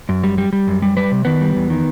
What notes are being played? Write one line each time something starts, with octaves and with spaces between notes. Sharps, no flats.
F#2
G3
G3
G3
F#2
G3
G3 B4
C3
D#3 B3 B4
G3
E2
D#3